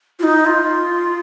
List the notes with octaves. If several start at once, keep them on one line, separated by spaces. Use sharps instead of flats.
F4
D#4
F4